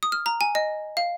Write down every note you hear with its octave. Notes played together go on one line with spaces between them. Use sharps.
D#6
F6
A#5
G#5
D#5
F5